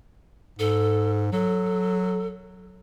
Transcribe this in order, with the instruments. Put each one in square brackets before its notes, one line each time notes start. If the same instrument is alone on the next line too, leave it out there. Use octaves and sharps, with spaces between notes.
[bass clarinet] G#2 [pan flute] A4
[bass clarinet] F#3 [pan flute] A4